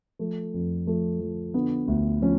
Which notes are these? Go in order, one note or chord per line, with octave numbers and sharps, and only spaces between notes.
F3 A3
F2
F3 A3
F3
D3 B3
D2
F3 C#4